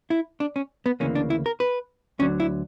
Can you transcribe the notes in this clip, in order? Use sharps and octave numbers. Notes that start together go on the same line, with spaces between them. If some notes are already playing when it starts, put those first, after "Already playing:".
E4
D4
C#4
B3
D2 C#3 E3 A#3 C#4
D4
E4
A#4
B4
D2 D3 F#3 C#4
E4